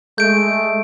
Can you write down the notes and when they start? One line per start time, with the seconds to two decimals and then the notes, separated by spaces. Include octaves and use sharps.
0.18 G#3 A3 G6 D7